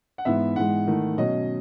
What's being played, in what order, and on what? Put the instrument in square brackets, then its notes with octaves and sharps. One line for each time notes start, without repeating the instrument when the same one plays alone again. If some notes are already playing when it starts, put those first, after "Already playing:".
[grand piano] F#5
G#2 E3 B3 E5
G#2 E3 G#3 F#5
D#3 A3 E4
B2 F#3 C#4 D#5